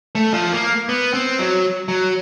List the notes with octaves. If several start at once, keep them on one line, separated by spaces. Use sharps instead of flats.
A3
F3
A#3
B3
C4
F#3
F#3